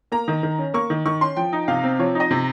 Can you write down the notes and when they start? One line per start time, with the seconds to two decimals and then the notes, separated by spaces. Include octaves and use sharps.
0.12 A#3 A#5
0.28 D#3
0.43 D#3
0.58 C#4
0.74 A#3 C#6
0.90 D#3
1.05 D#3 C#6
1.21 C#4 C6
1.36 F3 G5
1.52 D#4
1.68 C3 F5
1.83 C4
1.99 F3 C#5
2.15 D#4
2.20 D#5
2.31 C3